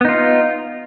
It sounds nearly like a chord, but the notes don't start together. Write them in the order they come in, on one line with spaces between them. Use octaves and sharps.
B3 D#4 F4